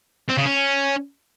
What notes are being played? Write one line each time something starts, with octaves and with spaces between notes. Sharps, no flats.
C4
C#3
C#4